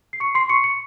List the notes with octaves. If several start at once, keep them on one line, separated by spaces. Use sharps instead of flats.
C7
C#6 C#7
C6 C7
C#6 C#7
C#6 C#7